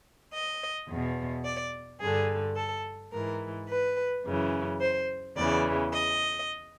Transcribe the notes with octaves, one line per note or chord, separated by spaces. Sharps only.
D#5
E2 B2
D5
G2 D3 G#4
A4
G#2 E3 A#4
B4
F#2 C#3 E3
C5
E2 C#3 E3 D5
D#5